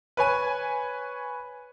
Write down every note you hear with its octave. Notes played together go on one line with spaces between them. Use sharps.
B4 C#5 G#5 D#7